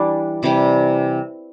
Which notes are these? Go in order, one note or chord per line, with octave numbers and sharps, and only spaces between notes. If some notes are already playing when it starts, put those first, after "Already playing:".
Already playing: E3 G3 D4
C3 E3 G3